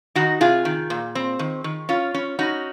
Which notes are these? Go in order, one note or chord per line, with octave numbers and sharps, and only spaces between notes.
D#3 D#4 F#4
C3 F4 G#4
D#3
A#2
C4
D#3
D#3
C#4 F4
C#4
C#4 D#4 F#4